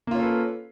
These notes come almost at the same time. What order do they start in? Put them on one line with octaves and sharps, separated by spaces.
A#3 F4 C#4 A4 B4